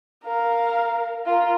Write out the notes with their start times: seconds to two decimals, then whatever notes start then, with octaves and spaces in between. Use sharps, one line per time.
0.24 A#4 F5
1.26 F4 A#4